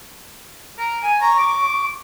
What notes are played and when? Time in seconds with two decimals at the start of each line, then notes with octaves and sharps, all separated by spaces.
0.78 A#4
1.03 G#5
1.21 A#5 C#6
1.38 D6